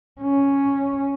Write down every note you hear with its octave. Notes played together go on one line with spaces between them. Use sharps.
C#4